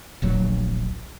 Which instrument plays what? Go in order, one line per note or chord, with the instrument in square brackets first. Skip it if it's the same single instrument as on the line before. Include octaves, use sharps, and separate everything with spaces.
[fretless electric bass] D1 A#1 F#3